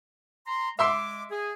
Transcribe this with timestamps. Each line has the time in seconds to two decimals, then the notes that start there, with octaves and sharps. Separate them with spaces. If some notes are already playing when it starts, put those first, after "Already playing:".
0.47 A#5 C6
0.79 G#3 E5 C6 D6 E6
1.31 G#4